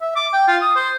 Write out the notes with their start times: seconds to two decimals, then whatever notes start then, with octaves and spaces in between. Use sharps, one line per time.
0.01 E5
0.16 D6
0.33 G5
0.48 F4
0.61 D#6
0.76 C5